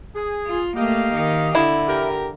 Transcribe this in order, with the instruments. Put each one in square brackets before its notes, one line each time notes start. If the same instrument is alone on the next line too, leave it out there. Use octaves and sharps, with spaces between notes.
[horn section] G#4
[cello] F4
[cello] A3 A#3 [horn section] G4 D#5 F5
[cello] D#3
[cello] D3 [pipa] E4
[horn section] G4 A#4